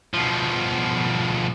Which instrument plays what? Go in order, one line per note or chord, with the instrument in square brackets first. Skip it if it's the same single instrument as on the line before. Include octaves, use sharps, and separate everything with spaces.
[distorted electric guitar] B2 F3